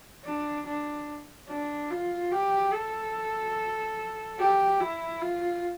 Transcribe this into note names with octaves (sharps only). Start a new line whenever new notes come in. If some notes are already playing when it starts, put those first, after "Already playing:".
D4
D4
D4
F4
G4
A4
G4
E4
F4